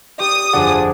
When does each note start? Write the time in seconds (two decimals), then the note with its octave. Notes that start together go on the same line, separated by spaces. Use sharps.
0.20 G4 D5 D#6
0.53 G1 F2 D4 F4 G#4 D5 F#5 D6